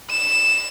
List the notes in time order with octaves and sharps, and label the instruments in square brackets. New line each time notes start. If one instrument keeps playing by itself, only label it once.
[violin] E7